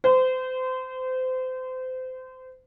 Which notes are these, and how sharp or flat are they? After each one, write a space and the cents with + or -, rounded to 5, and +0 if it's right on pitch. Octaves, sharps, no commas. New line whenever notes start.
C5 -30